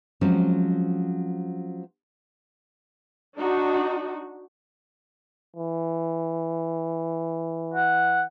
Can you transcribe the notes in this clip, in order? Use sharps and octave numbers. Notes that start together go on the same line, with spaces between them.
F3 F#3 G#3 C4 C#4
D4 D#4 F#4
E3
F#5